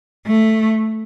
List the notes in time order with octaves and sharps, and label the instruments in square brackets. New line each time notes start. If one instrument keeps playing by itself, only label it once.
[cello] A3